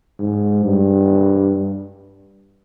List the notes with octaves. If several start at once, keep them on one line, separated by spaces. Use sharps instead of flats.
G#2
G2